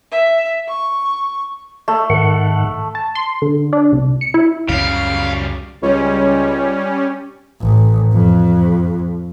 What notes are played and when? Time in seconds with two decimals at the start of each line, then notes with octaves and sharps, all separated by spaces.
0.12 E5
0.68 C#6
1.88 A3
2.10 G#2 D#3 F#5
2.95 A5
3.15 C6
3.42 D3
3.73 D4
3.93 C2
4.21 C#7
4.34 E4
4.69 C#2 F#2 C#3 F#3 G3 F5
5.83 C#2 G3 C#4
7.61 A1
8.12 F2